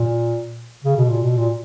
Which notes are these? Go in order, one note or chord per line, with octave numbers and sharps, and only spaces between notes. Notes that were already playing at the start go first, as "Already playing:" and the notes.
Already playing: A#2
C#3
B2
A#2
B2
A#2